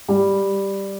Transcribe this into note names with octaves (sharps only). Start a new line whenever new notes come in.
G3